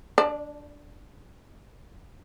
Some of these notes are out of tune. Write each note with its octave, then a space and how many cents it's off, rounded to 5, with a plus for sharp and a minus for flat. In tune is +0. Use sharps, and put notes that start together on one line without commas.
D4 -10 D5 +30